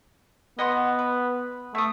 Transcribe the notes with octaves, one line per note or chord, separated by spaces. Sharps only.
B3 D#5 F#5 C6
B4
A3 E5 D#6